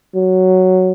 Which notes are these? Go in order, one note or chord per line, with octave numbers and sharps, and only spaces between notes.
F#3